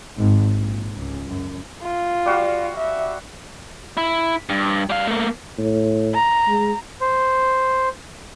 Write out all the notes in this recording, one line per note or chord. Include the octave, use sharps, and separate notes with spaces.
G#1
A#1
C#2
F#2
F4
G3 F#4 F5
E5
E4
G2
G3 F5
A3 A#3
A2
A#5
G#3
C5